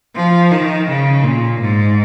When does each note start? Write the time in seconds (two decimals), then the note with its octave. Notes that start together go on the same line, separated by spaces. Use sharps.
0.15 F3
0.51 D#3
0.88 C#3
1.24 A#2
1.60 G#2